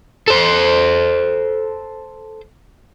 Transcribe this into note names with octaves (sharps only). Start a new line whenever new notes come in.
A4 C5